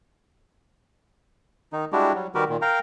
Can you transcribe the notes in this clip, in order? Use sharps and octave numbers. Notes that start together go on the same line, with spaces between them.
D#3 D#4
G3 G#3 D4 E4 F#4 G4
F#3 G3
D#3 G3 F#4 G4 A#4 B4
A#2 D#3
A#4 F5 G5 A#5